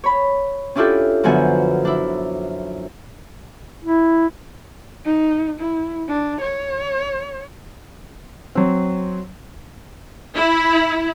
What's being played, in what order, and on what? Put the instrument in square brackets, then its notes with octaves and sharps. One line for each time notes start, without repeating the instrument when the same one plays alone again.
[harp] C#5 B5
C#4 D4 E4 F4 G4 A4
F#2 D3 F3 B3 G#5
D4 E4
[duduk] E4
[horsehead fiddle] D#4
E4
D4
C#5
[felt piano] F#3 C4
[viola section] E4